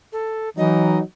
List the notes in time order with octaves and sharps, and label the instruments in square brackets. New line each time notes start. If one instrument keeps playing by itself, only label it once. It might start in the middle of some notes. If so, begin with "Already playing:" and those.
[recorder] A4
[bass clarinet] E3 [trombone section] F#3 D#4 [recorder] D#5